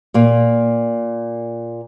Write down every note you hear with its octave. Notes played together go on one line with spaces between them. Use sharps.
A#2 A#3